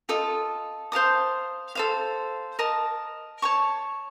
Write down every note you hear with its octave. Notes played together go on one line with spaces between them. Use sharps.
F4 A4 D#5
C5 F5 A5 D#6
A4 C5 F5
A#4 D#5 A5
C#5 A5 C#6